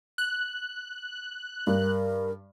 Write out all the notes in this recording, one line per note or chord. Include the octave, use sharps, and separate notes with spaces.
F#6
G2 A#4